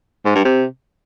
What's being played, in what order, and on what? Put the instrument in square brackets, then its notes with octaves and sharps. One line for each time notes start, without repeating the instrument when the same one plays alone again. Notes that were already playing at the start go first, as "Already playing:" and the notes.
[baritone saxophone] G#2
G2
C3